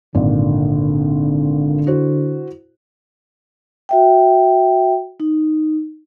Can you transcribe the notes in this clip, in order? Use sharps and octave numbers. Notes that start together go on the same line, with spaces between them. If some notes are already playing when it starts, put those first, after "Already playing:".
G#1 A#2 D3 D5
E4 F#4 C5
F#4 E5 G5
D#4